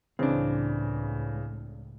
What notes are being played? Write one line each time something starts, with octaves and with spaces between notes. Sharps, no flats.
C#2 A2 C#3 E3 C4 D4